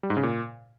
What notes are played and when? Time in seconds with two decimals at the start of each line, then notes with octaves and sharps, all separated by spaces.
0.03 G3
0.10 G#2
0.17 C#3
0.23 A#2